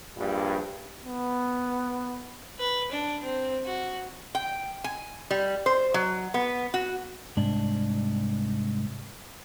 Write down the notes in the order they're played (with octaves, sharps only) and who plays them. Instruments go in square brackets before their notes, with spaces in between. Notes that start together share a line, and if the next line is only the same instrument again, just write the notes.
[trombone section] A#1 G2
[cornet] B3
[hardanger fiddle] B4
D4
C4
F#4
[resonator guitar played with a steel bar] G5
G#5
G3
C5
F#3
B3
F#4
[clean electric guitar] C2 G#2 D4